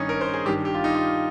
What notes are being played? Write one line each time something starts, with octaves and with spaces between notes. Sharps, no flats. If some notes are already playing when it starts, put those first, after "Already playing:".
Already playing: G2 D#3 C#4 D#4
A#4
C5
G#4
G2 D#3 G4
G4
F4
D#4
F4